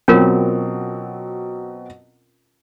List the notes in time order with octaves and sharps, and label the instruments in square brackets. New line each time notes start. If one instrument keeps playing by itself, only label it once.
[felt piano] B2 F#3 C4 [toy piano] C#4 F4 A#4